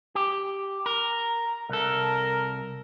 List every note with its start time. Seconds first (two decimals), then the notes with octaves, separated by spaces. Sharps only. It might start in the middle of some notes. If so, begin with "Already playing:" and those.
0.15 G4
0.86 A#4 A#5
1.69 C2 A4 A#4